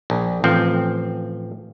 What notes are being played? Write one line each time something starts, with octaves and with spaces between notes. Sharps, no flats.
A#1
A1 F3 C4